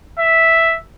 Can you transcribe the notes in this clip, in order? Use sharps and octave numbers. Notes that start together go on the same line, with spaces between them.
E5